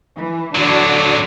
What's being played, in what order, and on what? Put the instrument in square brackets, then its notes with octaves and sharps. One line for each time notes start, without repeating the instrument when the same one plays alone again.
[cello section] E3
[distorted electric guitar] D3 F#3 [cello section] D4 F#4 D5